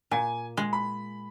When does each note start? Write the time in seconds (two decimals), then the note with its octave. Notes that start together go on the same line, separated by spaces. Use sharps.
0.11 A#2 G#5
0.57 G#3
0.73 B5